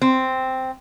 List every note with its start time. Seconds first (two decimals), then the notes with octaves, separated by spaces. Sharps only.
0.02 C4